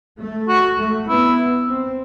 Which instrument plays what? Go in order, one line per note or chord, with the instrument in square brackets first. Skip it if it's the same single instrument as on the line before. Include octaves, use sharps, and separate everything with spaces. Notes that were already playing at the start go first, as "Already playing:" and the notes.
[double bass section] A3
[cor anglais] F#4
[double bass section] A3
[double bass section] B3 [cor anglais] E4
[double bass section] C4